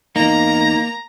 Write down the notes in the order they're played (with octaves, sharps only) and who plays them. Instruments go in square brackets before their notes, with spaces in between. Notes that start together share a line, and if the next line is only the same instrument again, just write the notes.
[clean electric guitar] E2 D#4 [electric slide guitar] A#3 [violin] A#5